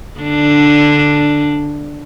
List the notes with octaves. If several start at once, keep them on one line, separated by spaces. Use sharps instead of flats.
D3 D4